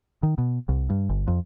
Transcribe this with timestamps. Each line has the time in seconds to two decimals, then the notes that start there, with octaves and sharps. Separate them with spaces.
0.23 D#3
0.38 B2
0.69 C2
0.90 G2
1.10 G1
1.27 F2